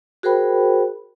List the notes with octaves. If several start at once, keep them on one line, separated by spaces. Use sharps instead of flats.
F#4 G#4 A#4 C5 G5 B5